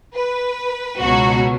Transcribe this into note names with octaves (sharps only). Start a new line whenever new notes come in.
B4
C#2 B2 F#3 F#4